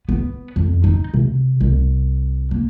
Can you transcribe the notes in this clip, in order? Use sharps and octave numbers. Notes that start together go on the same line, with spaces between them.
B3
F2
D#4
C3
C2
A#3